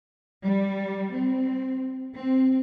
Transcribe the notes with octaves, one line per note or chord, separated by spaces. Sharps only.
G3
C4
C4